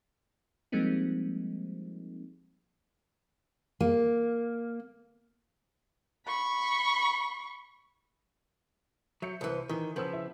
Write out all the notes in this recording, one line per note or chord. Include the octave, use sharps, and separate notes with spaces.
F3 G3 G#3 A#3 C4 D#4
A#3
B5 C#6
F#3 E5 G6 C#7
C2 E3 A#4 C5
D#3 E3
C#3 F3 B3 A#4 E6
E4